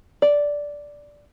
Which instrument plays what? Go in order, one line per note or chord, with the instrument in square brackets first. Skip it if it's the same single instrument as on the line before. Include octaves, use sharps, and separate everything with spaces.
[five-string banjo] D5